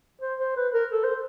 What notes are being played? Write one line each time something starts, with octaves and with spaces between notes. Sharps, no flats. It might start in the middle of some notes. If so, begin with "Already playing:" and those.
C5
C5
B4
A#4
A4
C5